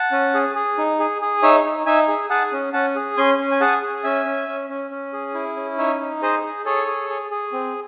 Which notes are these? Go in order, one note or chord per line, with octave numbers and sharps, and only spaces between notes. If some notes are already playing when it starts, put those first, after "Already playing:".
Already playing: F#5 A5
C#4
G#4
G#4
D#4
G#4
G#4
D#4 C#5 E5
D#4
D#4 E5 G#5
G#4
G#4 F#5 A5
C#4
C#4 F#5 A5
G#4
C#4 G#5 C6
C#4
G#5
G#4 F#5 A5
G#4
C#4 E5 G#5
C#4
C#4
C#4
C#4
G#4
E4
C#4
D#4 C#5 E5
D#4
G#4 C5 D#5
G#4
G#4 A4 C#5
G#4
G#4
G#4
C4